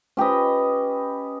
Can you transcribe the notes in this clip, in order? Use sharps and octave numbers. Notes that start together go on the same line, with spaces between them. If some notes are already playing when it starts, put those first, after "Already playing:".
C#4 G4 B4 D#5